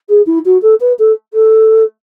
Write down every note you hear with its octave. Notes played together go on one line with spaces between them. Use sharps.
G#4
E4
F#4
A4
B4
A4
A4